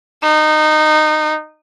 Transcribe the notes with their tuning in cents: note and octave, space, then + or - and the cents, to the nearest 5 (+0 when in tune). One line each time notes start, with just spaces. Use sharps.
D#4 -20